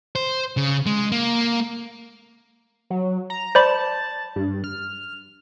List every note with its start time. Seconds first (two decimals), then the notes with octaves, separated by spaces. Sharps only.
0.15 C5
0.57 C#3
0.86 G#3
1.12 A#3
2.90 F#3
3.30 A#5
3.55 C5 D5 A5 B5
4.36 G2
4.64 F6